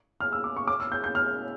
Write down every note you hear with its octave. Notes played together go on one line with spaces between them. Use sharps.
F6
E6
D6
C#6
D6
E6
G6
G6
F6